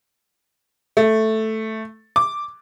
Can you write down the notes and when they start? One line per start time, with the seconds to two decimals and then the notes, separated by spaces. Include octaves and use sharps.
0.97 A3
2.16 D6